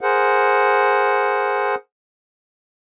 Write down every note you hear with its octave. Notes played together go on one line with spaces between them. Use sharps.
G#4 A#4 C5 F#5